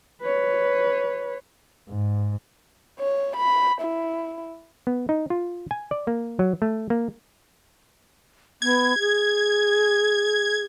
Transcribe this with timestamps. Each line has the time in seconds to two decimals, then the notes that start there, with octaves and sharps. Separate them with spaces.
0.22 B4 C#5
1.89 G#2
2.99 C#5
3.37 B5
3.81 E4
4.87 B3
5.09 D#4
5.30 F4
5.71 G#5
5.91 D5
6.07 A#3
6.39 F#3
6.62 A3
6.90 A#3
8.62 B3 G#6
8.99 G#4